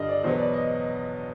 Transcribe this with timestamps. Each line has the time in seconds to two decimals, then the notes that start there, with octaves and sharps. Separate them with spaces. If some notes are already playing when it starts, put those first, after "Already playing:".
Already playing: G2 D3 G3 D#5
0.09 D5
0.23 E2 B2 F#3 B3 C5
0.38 D5
0.53 D#5